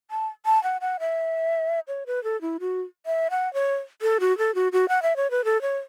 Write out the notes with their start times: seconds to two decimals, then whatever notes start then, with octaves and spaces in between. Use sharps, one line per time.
0.11 A5
0.45 A5
0.63 F#5
0.81 F#5
1.00 E5
1.88 C#5
2.07 B4
2.24 A4
2.41 E4
2.60 F#4
3.06 E5
3.31 F#5
3.54 C#5
4.02 A4
4.20 F#4
4.38 A4
4.55 F#4
4.72 F#4
4.89 F#5
5.02 E5
5.16 C#5
5.31 B4
5.45 A4
5.62 C#5